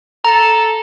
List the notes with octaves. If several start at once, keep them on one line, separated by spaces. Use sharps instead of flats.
A4 A#5